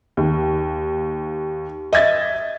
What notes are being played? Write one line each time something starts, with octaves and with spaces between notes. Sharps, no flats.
D#2
D#5 E5 G#6 A6